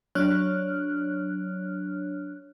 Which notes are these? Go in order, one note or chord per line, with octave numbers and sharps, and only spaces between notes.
F#3 D4 C#5 F6 F#6